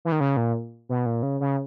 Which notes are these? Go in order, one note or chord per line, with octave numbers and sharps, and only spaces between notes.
E3
D#3
C#3
A#2
B2
A#2
C#3
C#3